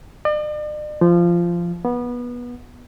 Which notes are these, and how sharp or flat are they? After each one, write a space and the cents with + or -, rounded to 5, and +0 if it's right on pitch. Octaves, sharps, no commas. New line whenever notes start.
D5 +45
F3 -15
B3 -20